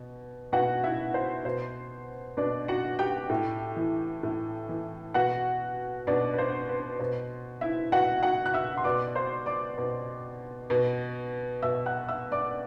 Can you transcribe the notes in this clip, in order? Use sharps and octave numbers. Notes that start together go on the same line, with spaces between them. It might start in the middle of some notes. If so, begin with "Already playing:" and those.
Already playing: B2
B2 F#4 F#5
E4 E5
C5
B2 C5
B2 D4 D5
F#4 F#5
G4 G5
A2
E3
A2
E3
B2 F#4 F#5
B2 D4 D5
B4
C5
B4
B2 C5
E4 E5
B2 F#4 F#5
F#4 F#5
F#6
E5 E6
C6
B2 D5 D6
C5 C6
D5 D6
B2
B2
B2 E5 E6
F#5 F#6
E5 E6
D5 D6